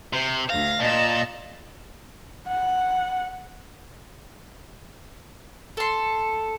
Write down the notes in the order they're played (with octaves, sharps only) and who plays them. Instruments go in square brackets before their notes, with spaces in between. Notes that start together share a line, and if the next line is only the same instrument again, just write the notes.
[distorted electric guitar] C3 [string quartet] C5
[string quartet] D2 A#6 [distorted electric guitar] F5
[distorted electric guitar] A#2 [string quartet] D#5 A5 E6
[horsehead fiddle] F#5
[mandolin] A4 C6